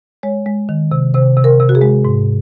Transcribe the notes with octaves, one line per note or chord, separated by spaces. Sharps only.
G#3 C#5
G#3
D#3
C3
C3 C5
C3
A#4
C3
F#4
G#4
G#3
G#2